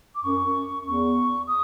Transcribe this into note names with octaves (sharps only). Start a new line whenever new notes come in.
D6
F#2 C#6
E2 C#6
D#6